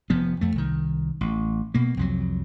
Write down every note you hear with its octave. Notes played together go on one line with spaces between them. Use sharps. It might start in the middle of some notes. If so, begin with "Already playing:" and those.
F1 F3 B3
F2 A3
C2 D#3
A1
B2 A#3
C2 F2 F#3